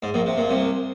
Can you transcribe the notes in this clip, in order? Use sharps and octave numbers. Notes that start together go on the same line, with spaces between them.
G#2
A#1 A#2
C3
A#2
C2 C3